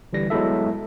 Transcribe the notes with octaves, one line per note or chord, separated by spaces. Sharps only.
D3 E3 G3 A#6
F#3 G#3 B3 E4 A4 E5